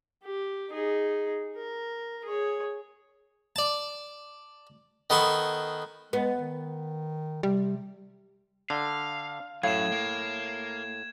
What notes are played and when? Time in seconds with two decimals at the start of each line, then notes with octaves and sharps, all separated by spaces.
0.24 G4
0.71 D#4 G#4
1.56 A#4
2.25 G#4 C#5
3.56 D5 A5
5.10 D#3 B3 A4 C6 C#6
6.13 G#3 B3
6.39 D#3
7.43 C3 G3
8.70 D3 F5
9.63 F#2 A2 F#3 F5 G#6 E7
9.92 A#3